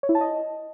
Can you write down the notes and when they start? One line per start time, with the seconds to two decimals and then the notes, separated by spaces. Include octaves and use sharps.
0.03 C#5
0.09 E4
0.15 A5
0.21 D#5